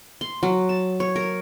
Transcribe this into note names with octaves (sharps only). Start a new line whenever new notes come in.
C6
F#3
A5
C#5
A#4